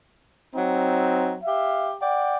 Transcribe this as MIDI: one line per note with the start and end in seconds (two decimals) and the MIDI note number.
0.55 1.35 54
0.55 1.35 60
0.55 1.35 63
1.43 1.92 67
1.43 1.92 76
1.43 1.92 77
2.00 2.37 74
2.00 2.37 78
2.00 2.37 79